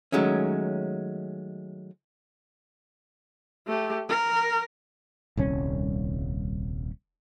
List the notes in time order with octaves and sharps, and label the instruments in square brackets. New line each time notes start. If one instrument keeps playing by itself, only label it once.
[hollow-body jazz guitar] D#3 F#3 G#3 A3 C#4
[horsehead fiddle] A3 G4
A#4
[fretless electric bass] D#1 C2 C#4